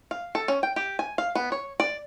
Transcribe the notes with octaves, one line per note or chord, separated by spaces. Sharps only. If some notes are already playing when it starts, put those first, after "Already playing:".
F5
A4
C#4
G5
G4
G#5
F5
B3
C#5
D5